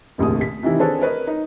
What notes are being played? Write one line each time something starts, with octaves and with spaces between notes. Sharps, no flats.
F1 A#1 D#2 A2 C3 D#6
B6
C3 D#3 E3 E4
C4 D4 G#4 A4 B4 C#5
A#4 B4 C#5 D#5
D#4